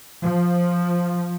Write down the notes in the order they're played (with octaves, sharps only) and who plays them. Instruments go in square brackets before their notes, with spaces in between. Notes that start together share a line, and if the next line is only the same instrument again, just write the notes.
[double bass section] F3